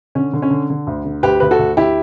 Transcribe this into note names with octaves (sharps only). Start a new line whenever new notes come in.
D3 C#4
D3
C#4
D3
D3
D2
D3
D2 G4 B4
D2 B4
F#4 A4
D2
D2 E4 G4